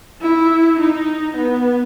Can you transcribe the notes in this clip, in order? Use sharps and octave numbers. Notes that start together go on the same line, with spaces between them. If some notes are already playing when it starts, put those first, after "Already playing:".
E4
D#4
B3